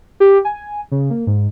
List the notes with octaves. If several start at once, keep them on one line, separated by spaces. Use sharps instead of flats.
G4
G#5
C#3
A#3
G#2